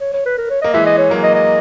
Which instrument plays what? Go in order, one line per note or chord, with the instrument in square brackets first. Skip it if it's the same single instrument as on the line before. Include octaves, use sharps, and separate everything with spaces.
[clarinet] C#5
C#5
B4
A#4
C#5
[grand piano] A#3 [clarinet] D#5
[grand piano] E3 G#3 [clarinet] E5
[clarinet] D#5
C#5
[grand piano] F#3 A#3
[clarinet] D#5
D#5